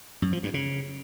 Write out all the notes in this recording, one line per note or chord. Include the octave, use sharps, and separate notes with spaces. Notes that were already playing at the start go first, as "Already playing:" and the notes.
F#2
F3
G2
C#3